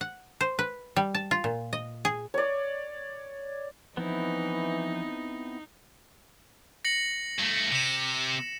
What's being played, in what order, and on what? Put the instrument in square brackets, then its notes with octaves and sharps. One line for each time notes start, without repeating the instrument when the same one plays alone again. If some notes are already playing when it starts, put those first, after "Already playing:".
[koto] F#5
C5
B4
G3
A5
F4
A#2
D#5
G#4
[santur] C#5 D5
[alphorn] E3 [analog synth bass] F3 [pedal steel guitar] B3 C4 E4 [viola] D#4
[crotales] A#6 C#7 F#7
[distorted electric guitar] G2 A3
[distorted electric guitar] C3 [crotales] C#7 E7